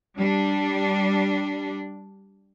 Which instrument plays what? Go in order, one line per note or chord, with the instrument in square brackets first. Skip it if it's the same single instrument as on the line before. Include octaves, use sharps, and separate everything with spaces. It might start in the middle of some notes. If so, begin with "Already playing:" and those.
[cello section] G3 D4